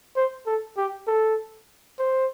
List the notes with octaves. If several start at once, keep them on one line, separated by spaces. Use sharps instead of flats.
C5
A4
G4
A4
C5